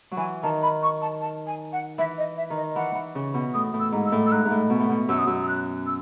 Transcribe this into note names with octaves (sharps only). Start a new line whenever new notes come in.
F#3
E3 G#5
D#3 A5
B5
C#6
A5
A5
G#5
F#5
E3 E5
D#5
E5
D#3
D#5
E3 F#5
E3
C#3
B2
A2 D#6
A2
E6
G#2
E6
A2
E6
G#2 F#6
G#2
A2
B2
A2
B2
F#2 E6
D#6
F#2 E6
E6
F#6
E6